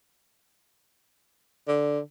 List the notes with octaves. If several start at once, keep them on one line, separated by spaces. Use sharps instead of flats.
D3